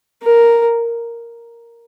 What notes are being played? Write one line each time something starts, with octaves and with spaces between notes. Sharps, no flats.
A#4